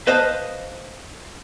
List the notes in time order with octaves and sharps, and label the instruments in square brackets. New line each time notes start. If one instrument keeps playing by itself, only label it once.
[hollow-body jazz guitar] B4 C5 D#5 F5 A5